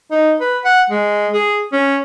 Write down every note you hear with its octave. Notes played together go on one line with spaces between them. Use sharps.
D#4
B4
F#5
G#3
G#4
C#4